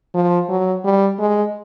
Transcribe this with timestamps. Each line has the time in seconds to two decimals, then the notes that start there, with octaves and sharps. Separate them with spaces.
0.15 F3
0.49 F#3
0.85 G3
1.19 G#3